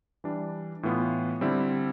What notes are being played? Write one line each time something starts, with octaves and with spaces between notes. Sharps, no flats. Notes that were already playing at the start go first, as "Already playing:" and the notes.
E3 G3 D4
A2 E3 B3 F4
D3 G3 C4 E4